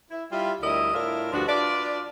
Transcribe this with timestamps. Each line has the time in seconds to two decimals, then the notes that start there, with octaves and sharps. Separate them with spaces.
0.10 E4
0.32 G3 E4 F4
0.62 D2 G3 E4 A#4 D#5
0.94 A2 D4 E4 F4 A#4
1.32 D2 G2 F3 D4 F#4
1.48 D4 F4 B4 D5